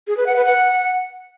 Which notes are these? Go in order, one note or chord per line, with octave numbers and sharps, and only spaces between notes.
G#4
B4
F#5
B4
F#5